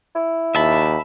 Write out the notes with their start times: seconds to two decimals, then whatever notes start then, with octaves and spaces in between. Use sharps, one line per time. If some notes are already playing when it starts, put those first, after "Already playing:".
0.15 E4
0.55 D#2 E5 A5 B5